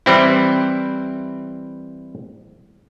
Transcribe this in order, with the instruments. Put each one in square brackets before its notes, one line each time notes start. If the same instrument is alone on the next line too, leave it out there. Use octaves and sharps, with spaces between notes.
[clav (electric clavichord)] E3 G3 C4 E4